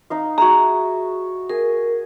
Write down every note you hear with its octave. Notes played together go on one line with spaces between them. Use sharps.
D#4 D#5 F5
F#4 G#4 E5 A#5
G#4 A#4